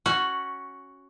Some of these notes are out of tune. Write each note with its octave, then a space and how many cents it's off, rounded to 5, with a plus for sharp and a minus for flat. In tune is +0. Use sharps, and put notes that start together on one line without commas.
C#4 -5 F#4 +5